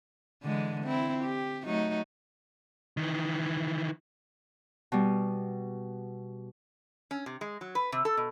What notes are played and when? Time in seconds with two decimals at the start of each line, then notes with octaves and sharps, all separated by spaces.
0.43 D3 E3 G#3
0.84 C4 E4
1.24 G4
1.66 F#3 A3 D#4
2.97 D#3 E3
4.92 B2 G3
7.11 C#4
7.26 C3
7.41 G#3
7.61 F#3
7.75 B4
7.92 C3
8.05 A4
8.17 B2